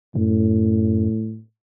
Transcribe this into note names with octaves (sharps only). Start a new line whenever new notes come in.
F#2 A2